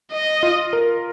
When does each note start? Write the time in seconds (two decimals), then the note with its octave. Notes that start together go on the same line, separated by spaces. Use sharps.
0.13 D#5
0.43 F4
0.73 A#4